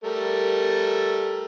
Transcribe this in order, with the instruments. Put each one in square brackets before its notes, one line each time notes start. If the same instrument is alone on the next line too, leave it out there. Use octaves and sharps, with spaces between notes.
[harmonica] G3 A3 A#4